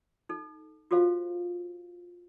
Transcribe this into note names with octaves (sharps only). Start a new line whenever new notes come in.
D#4 A4
F4 F#4 A4 C5 F5